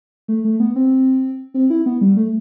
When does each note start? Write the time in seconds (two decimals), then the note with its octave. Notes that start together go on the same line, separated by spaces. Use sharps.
0.28 A3
0.45 A3
0.60 B3
0.76 C4
1.54 C4
1.70 E4
1.86 B3
2.01 G3
2.17 A3